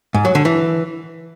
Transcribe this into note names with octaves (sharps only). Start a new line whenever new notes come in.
G#2
F#3
D3
E3